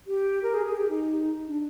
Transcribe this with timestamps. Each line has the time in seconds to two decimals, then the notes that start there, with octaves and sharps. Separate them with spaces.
0.07 G4
0.43 A#4
0.54 G#4
0.66 G#4
0.77 G4
0.89 D#4
1.47 D4